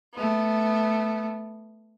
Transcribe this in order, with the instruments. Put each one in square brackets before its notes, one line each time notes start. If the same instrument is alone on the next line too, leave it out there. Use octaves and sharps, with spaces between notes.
[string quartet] A3 B3